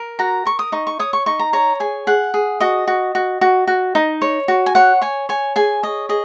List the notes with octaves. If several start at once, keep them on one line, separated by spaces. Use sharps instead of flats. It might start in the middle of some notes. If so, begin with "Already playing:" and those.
Already playing: A#4
F#4 A#5
A#4 C#6
D#6
D#4 C#6
C#6
C#5 D#6
C#6
D#4 C#6
A#5
C#5 A#5
G#4 G#5
G#4 F#5
G#4
F#4 D#5
F#4
F#4
F#4
F#4
D#4
C#5
F#4
G#5
C#5 F#5
C#5 G#5
C#5 G#5
G#4 G#5
C#5 D#5
G#4 D#5